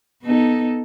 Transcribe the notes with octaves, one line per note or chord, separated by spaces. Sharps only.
B3 D#4 A4